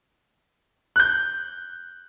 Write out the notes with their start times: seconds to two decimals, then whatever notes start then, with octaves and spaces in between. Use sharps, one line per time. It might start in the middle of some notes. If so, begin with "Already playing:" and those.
0.96 F#6 G6